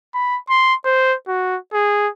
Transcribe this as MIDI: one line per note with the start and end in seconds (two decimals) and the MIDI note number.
0.14 0.38 83
0.49 0.75 84
0.85 1.14 72
1.28 1.58 66
1.73 2.09 68